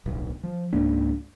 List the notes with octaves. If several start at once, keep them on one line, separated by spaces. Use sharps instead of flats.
D1 B1
F3
C#2 G#2 A#3 D4